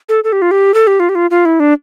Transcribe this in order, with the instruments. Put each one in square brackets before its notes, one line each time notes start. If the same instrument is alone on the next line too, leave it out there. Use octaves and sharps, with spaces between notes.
[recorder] A4
A4
G4
F4
G4
A4
G4
F4
G4
F4
F4
E4
D4